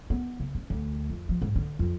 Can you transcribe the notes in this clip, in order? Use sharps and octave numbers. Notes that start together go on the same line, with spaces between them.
B3
C#3
C#4
D2
F2
F3
G#2
D3
F2